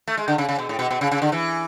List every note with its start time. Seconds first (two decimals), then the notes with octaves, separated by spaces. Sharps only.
0.08 A3
0.17 G#3
0.28 D3
0.38 C#3
0.49 C#3
0.59 B2
0.69 A2
0.79 B2
0.91 B2
1.01 C#3
1.11 C#3
1.22 D3
1.32 E3